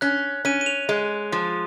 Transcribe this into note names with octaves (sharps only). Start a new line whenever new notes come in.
C#4 F#6
C#4 D#7
D#7
F7
G#3
F3